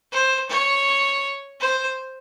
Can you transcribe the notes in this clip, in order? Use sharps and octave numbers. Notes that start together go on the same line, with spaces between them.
C5
C#5
C5